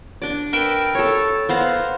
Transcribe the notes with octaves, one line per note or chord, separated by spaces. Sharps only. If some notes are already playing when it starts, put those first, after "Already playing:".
D4 D5
A#4 B4 E5 G5
A4 C#5
B3 C5 F5 A#5